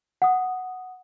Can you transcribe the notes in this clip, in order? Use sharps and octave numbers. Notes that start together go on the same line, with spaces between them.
F#5 D#6